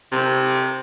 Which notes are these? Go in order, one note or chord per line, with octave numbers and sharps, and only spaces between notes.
C3